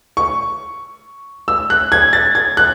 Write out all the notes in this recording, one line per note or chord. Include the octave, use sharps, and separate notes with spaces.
C#6
E6
F#6
G#6
A6
G#6
F#6